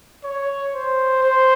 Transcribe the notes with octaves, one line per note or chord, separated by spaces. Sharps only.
C#5
C5
C5